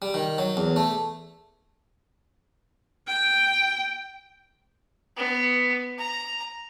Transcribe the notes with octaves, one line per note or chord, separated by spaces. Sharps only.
G3
D#3
F#3
E2
A3
G5
B3
A#5